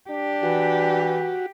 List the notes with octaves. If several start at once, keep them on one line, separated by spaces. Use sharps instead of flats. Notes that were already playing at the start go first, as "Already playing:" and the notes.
D4 G4
E3 F#4